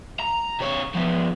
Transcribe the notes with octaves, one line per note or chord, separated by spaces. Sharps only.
A#5
C3 C#5
F3 B3